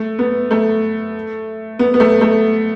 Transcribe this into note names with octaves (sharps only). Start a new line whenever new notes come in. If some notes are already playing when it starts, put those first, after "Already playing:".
Already playing: A3
B3
A3
B3
B3
A3
A3